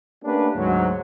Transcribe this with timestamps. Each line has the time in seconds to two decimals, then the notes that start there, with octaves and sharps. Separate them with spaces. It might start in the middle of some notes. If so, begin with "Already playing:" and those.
0.23 A3 A#3 C#4 D4 G4 B4
0.54 D2 G#2 F#3